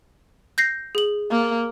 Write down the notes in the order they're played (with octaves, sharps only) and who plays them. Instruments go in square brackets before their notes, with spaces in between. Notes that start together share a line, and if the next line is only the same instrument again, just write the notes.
[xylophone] G6 A#6 C7
G#4 F#7
[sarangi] A#3